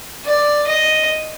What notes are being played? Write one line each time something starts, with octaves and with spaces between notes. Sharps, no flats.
D5
D#5